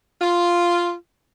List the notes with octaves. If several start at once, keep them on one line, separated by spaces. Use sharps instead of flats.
F4